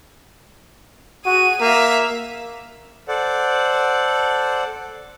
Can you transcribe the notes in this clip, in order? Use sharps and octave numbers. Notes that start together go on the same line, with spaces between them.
F#4 G#4 D#7
A#3 E5 F5
A4 C5 D5 F#5